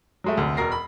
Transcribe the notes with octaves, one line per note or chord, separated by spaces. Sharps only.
F#3 G#3 A3
F1 D2
E1 B2 A#4 A#6 C7
B5